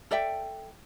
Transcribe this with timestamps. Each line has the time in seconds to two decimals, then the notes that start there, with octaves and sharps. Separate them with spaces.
0.11 A4 D5 E5 G5